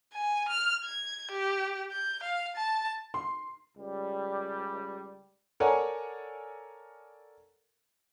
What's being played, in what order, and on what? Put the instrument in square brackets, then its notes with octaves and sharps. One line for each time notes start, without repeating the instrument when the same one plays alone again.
[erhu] G#5
F6
G#6
G4
G6
F5
A5
[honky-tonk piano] C6
[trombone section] C#2 G3
[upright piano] A4 A#4 C#5 D5 F#5 G#5